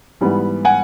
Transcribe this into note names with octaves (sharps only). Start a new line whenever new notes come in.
G#2 E3 G3 B3
F#5 G#5